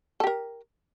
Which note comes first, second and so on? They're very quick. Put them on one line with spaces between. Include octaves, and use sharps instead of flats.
A4 G4 A#4